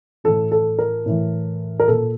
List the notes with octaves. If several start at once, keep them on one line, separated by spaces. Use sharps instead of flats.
A2 E3 A4
A4
A#4
A2 E3
A#4
A#2 A4